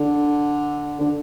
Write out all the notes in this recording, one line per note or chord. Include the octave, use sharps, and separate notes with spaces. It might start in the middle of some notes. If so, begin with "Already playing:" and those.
Already playing: D3
D3